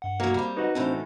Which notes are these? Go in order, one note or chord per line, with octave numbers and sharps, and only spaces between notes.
G2 F#5
F#3 A3 A#3
G3 C4
D#4 F#4 B4
A2 E3 C4 D4 A4 C5